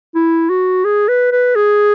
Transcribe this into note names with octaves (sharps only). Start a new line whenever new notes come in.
E4
F#4
G#4
B4
B4
G#4